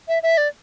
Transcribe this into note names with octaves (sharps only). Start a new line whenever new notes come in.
E5
E5
D5